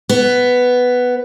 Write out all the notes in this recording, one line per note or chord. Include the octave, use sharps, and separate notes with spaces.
B3